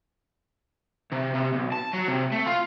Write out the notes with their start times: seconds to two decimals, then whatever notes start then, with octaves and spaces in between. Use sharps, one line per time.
1.12 C3
1.34 C3
1.53 B1
1.72 A5
1.93 F#3
2.08 C3
2.32 A3
2.47 F4